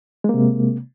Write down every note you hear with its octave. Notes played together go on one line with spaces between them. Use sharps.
C3 G#3 A#3